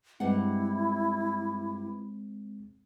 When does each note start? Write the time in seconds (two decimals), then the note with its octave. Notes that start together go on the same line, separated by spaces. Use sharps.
0.20 G2 G#3 C4 E4 F#5